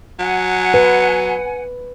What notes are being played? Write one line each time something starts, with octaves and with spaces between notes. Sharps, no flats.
F#3 F#5 G#5
B4